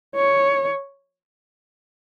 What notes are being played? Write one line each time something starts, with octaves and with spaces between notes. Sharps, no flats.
C#5